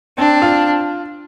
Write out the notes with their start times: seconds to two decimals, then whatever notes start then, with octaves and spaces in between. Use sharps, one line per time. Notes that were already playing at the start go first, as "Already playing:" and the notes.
0.18 C4 D4
0.42 F4